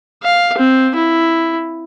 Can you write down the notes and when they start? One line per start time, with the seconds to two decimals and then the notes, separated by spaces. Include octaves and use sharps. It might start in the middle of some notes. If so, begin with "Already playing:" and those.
0.23 F5
0.58 C4
0.96 E4